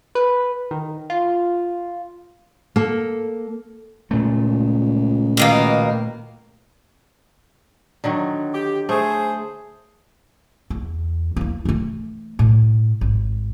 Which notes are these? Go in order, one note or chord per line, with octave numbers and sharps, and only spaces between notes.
B4
D#3
F4
A#3 A4
C#2 A#2 A3
B2 D#3 A#3
D3 D#3 F#3
G4
A3 G#4 C5
E2
A#3 E4
E3 A3
A2
G#1